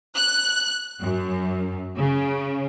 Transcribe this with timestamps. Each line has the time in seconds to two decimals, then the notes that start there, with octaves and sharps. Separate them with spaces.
0.16 F#6
1.00 F#2
1.96 C#3